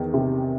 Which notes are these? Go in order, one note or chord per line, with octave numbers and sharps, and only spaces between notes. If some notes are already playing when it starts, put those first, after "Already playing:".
Already playing: E2 D#3
C3